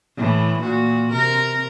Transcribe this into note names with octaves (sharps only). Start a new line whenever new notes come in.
A2 E3
A#2 F#4
C3 A#4